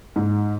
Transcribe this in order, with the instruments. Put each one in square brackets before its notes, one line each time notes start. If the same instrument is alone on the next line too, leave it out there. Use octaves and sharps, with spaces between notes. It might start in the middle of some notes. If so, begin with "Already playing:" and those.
[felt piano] G#2